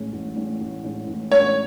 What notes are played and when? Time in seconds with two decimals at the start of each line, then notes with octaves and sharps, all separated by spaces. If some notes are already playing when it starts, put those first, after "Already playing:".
Already playing: A1 A2 G#3 C#4
0.13 A1
0.36 A2 G#3 C#4
0.61 A1
0.84 A2 G#3 C#4
1.07 A1
1.32 A2 G#3 C#4 C#5